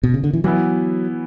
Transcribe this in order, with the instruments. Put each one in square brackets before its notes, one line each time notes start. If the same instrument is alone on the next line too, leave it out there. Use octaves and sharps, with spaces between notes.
[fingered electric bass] B2
C#3
D3
E3
[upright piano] E3 B3 E4 [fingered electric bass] F#3